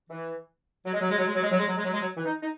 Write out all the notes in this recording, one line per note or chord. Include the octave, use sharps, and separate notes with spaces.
E3
F#3
G#3
F#3
G#3
F#3
G#3
F#3
G#3
F#3
G#3
F#3
G#3
F#3
G#3
F#3
E3
D#4
D#4